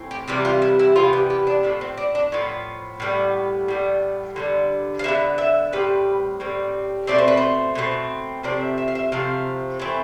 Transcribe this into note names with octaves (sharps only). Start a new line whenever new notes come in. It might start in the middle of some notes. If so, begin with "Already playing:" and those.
Already playing: A2 E3 C4
G4
C3 E3 G3 B3 G4
F4
E4
E4
C3 E3 G3 B3 F4
G4
G4
D4
A2 F3 B3 D4
C4
D4
D4
A2 F3 B3
A2 G3 B3
A2 G3 B3
D3 G3 B3
F5
D3 G3 B3 E5
E5
A2 G3 C4 B4
A2 G3 C4
B2 A3 C4 D5
C5
B4
C5
B2 A3 C4
C3 F3 A3 C4 D5
E5
E5
F5
E5
C3 F3 A3 C4 F5
E3 A3 C4